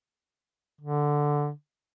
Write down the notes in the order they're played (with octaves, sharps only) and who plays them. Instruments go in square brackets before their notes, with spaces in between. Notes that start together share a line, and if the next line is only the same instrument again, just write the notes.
[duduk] D3